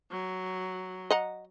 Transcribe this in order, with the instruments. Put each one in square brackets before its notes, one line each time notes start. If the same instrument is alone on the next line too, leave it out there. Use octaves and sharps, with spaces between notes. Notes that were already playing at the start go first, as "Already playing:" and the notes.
[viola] F#3
[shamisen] D#5 F#5 A#5